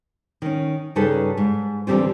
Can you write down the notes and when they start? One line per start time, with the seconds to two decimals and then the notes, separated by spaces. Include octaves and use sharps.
0.42 D#3 C#4
0.96 G2 C#3 D#4 G#4 A4 B4
1.37 G#2
1.87 E2 D3 G3 C4 F4